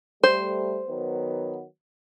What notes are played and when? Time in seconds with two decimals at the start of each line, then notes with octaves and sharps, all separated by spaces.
0.23 G3 A3 C5
0.89 D#3 F#3 B3